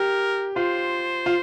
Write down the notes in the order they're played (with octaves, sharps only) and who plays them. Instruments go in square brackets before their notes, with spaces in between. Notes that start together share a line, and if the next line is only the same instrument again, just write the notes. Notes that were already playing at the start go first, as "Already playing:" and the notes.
Already playing: [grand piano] G4 [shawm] A#4
[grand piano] F4 [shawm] C5
[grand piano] F4